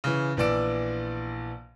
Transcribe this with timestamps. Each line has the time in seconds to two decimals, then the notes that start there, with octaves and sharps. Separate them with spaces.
0.04 C#3 E3
0.37 A#1 E3 B3 D5 E6 D7